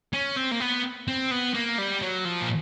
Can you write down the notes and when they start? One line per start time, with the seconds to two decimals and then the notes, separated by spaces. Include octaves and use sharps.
0.13 C#4
0.37 C4
0.52 A#3
0.60 B3
1.08 C4
1.31 B3
1.54 A#3
1.78 G3
2.02 F#3
2.25 F3
2.42 A#2